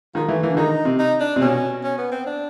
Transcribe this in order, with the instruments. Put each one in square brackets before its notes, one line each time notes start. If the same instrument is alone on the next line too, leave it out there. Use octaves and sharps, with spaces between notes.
[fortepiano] D#3 [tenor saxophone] F3
[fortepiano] E3 [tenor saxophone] A3
[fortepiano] E3 [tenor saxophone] A#3
[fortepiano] D3
[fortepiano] D#3 [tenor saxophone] D#4
[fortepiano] C3
[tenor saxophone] D#4
D4
[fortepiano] C3
[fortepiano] B2 [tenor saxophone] C#4
[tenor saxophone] C#4
B3
C4
D4